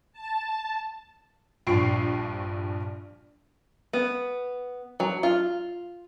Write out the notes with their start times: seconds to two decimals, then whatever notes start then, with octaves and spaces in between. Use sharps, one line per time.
0.13 A5
1.67 A#1 G2 F3 C#6 C7 D7
3.93 B3
5.00 F#3
5.23 F4